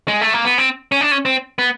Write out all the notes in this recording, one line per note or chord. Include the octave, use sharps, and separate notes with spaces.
G#3
A3
A#3
B3
C4
C#4
D4
C#4
C4
B3